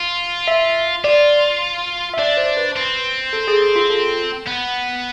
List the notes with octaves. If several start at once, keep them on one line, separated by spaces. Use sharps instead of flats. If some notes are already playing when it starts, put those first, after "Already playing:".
Already playing: F4
E5
F4 D5
E5
D4 D5
C5
B4
C4
A4
G#4
G#4
F4
A4
B3